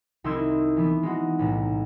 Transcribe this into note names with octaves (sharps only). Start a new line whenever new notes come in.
C2 D#4 E4 C6 E6 G#6
E3 B3
G#3 D#4 F#4
B1 A2 C3